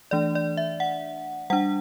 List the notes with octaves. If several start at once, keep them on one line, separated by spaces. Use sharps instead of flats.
E3 A3 D4 D5
D5
E5
F#5
G3 D4 F#5